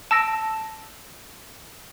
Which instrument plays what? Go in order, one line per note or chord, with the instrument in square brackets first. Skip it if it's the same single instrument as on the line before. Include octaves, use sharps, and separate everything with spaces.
[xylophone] A5 E6 A#6 D7